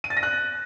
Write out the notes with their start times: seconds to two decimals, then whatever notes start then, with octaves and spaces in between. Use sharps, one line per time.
0.04 D#7
0.10 A6
0.17 A#6
0.23 F#6